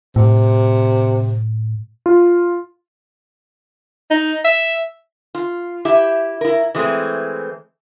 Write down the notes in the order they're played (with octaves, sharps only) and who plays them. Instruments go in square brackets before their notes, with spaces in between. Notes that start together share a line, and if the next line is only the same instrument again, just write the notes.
[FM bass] A2 [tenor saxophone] C3
[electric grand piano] F4
[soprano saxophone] D#4
E5
[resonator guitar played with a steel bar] F4
E4 G4 E5
E4 A#4
E3 G#3 A3 B3 C4